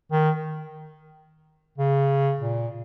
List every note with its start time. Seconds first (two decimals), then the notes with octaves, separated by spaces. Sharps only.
0.12 D#3
1.78 C#3
2.40 A#2